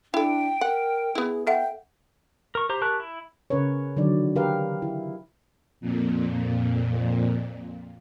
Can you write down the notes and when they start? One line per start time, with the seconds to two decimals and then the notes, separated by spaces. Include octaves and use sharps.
0.14 D4 E4 A4 G5
0.61 A#4 F#5
1.15 B3 E4 G#4
1.47 A4 E5 F#5 G5
2.55 A#4 C#6
2.69 G4 C5 A#5
2.81 G4 A#4 A5 C#6 F#6
3.00 E4
3.50 C#3 C#4 A#4 B4 C#5
3.97 D3 D#3 F#3 D5
4.36 G4 A#4 B4 F5
4.82 E4
5.81 F2 A#2